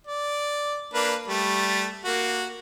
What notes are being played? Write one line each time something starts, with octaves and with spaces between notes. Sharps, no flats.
D5
A#3 D4 B4
G3 A3
A#3 F#4